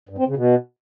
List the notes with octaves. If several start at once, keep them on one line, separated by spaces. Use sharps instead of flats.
G2
C4
C#3
B2